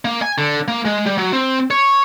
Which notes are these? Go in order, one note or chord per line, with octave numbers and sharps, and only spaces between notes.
A#3
G#5
D3
A#3
G#3
G3
F#3
C4
C#5